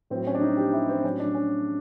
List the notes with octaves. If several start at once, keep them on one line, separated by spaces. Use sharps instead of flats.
A2 F#3 C4
C#4
D4
D#4
G4
E4
C4
A2 F#3 C#4
D4
C#4